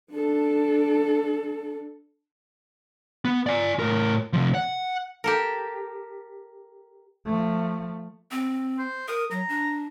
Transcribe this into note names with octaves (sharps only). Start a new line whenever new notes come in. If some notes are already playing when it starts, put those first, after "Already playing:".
D4 A4
B3
D5 G#5
A2 A#4
C3 F3
F#5
G4 A4 A#4
F3 A3
C4
C5
A#4 D#6
F#3 A#5
D4